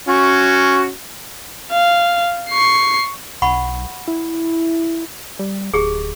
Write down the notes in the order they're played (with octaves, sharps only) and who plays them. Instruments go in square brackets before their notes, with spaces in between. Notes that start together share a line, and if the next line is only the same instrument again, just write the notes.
[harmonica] C#4 F#4
[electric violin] F5
C#6 C7
[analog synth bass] B1 [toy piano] F#5 B5 C#6
[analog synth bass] E4
G3
[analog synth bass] D1 [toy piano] G4 G#4